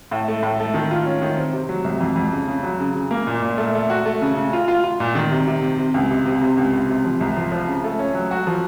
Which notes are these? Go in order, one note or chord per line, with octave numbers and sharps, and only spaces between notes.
A2
A3
A2
A3
D#3
F4
C#4
D#3
C4
C3
F#3
C2
F2
F2
C#3
C#3
F#3
C#3
C#3
A#3
A#2
A#2
A3
A3
F#4
A3
C#3
C#3
F4
F4
F4
A#2
D#3
C3
C3
C3
C3
C#2
C3
C3
C3
C#2
C#2
C3
F3
C2
F3
F3
C#3
A3
C#4
F#3
F#4
F3